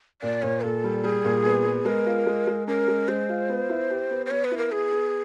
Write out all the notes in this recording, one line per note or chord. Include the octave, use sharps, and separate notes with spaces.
A#2 D5
A#2 C#5
A#2 A4
G3
G3 G#4
A#2
B3
B3
G#3 A#4
F4
G#3
G#3
C#4 A#4
G#3
G#3 C5
F4
B3
E4
G4
B3
C5
B3 C#5
B4
E4
A#4
B3 G#4
B3